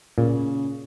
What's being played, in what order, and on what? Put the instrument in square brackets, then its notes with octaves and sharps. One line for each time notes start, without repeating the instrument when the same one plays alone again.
[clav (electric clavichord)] A#2 [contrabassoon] C#3